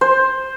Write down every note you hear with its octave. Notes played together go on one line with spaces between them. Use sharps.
C5